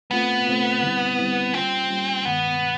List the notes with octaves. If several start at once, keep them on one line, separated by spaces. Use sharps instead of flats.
A3 B3 C4 F4
A3 C4 F4
D3 G3 C4 E4
D3 G3 C4 E4
G3 A#3 C4 C#4 F4
G3 A#3 C#4 F4
G2 D#3 G#3 B3